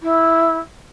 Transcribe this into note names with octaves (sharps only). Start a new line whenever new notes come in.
E4